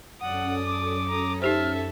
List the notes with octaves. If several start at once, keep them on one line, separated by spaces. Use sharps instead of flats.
F#2 C#4 A4 D5 F#5 D#6
D6
A#5 D#6
D#4 G4 C5 E5 A5 F6